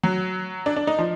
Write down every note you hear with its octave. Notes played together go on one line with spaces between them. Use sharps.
F#3
D4
D4
D#4
F3